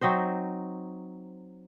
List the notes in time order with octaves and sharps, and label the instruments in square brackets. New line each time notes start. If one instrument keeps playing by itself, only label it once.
[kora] F#3 C4 D#4 C5